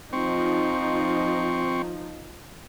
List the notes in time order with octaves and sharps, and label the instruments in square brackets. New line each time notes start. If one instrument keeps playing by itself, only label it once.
[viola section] F3 D#4 [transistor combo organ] C4 C#6